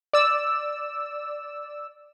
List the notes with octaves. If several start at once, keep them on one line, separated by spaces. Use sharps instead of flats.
D5 E6